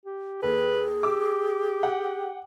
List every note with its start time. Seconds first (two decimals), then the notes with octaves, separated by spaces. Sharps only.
0.05 G4
0.42 D#2 G#4 A4 B4
1.03 G4 D6 E6
1.83 F#5 G5